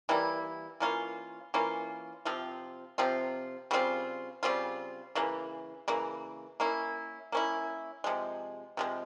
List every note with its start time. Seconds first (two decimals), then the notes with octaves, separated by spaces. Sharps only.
0.09 E3 G3 A#3 E4
0.80 E3 A#3 C#4 F4
1.54 E3 A#3 C#4 F4
2.25 C3 F3 C4 F4
2.98 C3 F3 C4 F4
3.71 C#3 G3 C4 F4
4.43 C#3 G3 C4 F4
5.15 C#3 E3 A#3
5.88 C#3 E3 A#3
6.60 A#3 C#4 E4
7.32 A#3 C#4 E4
8.04 C3 F3 G#3
8.77 C3 F3 G#3